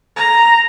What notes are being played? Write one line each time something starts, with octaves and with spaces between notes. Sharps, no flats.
A#5